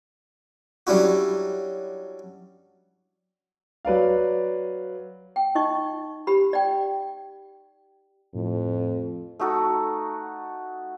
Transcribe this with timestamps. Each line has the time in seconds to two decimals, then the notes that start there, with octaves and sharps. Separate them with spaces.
0.87 F#3 G3 C#4 D4 E4 F#4
3.85 F#3 B4 D5 F5
5.36 G5
5.55 D#4 D#5 C#6
6.27 G4 B5
6.53 D5 G5
8.34 F2 A2
9.39 A3 D#4 F#4 A4